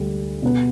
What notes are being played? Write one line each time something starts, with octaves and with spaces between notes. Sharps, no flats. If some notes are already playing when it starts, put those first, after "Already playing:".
Already playing: D2 D3 G3
B2 B3